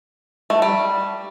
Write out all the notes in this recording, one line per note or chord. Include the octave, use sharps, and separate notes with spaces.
A3
G3